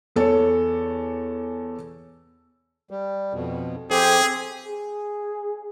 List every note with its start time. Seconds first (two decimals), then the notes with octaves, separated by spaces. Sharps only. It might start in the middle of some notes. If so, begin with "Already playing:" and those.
0.16 E2 A4 C#5
2.91 G3
3.33 F2 B2
3.91 F2 C4 G4 G#4
4.66 G#4